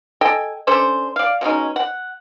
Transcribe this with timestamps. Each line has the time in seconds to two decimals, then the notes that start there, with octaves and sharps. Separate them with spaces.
0.21 A4 D#5 G5 G#5
0.67 C#4 D4 A4 C5
1.16 D5 F5
1.41 B2 G#3 C#4 D#4
1.76 F#5